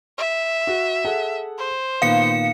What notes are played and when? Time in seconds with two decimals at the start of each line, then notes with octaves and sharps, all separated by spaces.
0.18 E5
0.67 F#4
1.05 G#4 A4 F#5
1.58 C5
2.02 A#2 D#3 B3 F5 C#7